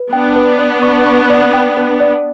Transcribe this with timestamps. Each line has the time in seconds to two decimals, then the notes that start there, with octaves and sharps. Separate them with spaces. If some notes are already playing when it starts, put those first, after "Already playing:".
Already playing: B4
0.12 B3 D4 G5
0.36 B4
0.59 D5
0.82 C#6
1.07 C#6
1.30 D5
1.53 G5
1.77 B4
2.00 D5